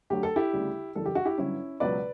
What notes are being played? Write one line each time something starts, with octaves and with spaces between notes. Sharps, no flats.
D2 D3 F#3 G4
A4
E4 G4
D2 C#3 G3
F#1 F#2 E3 G3 A4
G4
F#4
E4 G4
G1 G2 F#3 C#4 E4
C#2 B2 F#3 B4 D5